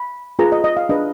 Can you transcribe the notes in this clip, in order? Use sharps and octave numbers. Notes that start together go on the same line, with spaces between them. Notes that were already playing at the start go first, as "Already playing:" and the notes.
Already playing: B5
F4 G#4 B4 A#5
D#5
D#5
F5
D4 G#4 B4 D#5